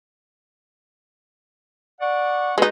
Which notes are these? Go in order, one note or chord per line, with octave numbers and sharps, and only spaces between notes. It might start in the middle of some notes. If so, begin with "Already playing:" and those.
D5 F#5 C#6
G#3 C#4 D#4 F#4 B4